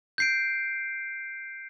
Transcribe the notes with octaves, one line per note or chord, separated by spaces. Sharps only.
G6 C7 D7